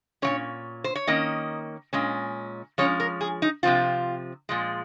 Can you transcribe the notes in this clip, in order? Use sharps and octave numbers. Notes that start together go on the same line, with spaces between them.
A#2 F#3 C#4 C#5
C5
C#5
D#3 A#3 C#4 D#5
A#2 G#3 C#4
F3 G#3 C#4 C#5
A#4
G#4
D#4
C3 F3 C4 F4
A#2 F3 G#3